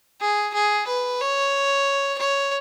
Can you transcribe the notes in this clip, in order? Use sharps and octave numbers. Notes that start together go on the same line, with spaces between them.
G#4
G#4
B4
C#5
C#5